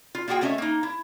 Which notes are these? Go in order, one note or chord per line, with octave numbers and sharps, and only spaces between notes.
F4
A#3 F4 F#4 G#4 G5
A3 B3 C#4 C#5 D#5 E5
A#3 D#4
E4